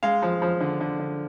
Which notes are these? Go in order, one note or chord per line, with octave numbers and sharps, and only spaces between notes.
G#3 F5
F3
F3
D3
D3
D3